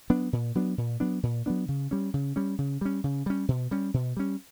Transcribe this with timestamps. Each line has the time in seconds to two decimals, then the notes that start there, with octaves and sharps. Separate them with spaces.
0.10 F#3 B3 D4
0.33 A#2
0.55 F#3 B3 D4
0.78 A#2
1.00 F#3 B3 D4
1.23 A#2
1.46 F#3 B3 D4
1.68 C#3
1.91 G3 C#4
2.14 C#3
2.36 G3 C#4
2.58 C#3
2.81 G3 C#4
3.04 C#3
3.26 G3 C#4
3.48 B2
3.71 G3 C#4
3.94 B2
4.17 G3 C#4